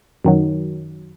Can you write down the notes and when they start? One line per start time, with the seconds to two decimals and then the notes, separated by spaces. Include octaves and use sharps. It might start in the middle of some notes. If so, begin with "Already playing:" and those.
0.24 F#2 D#3 F#3